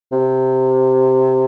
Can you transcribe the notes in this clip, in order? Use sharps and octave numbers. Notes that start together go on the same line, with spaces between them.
C3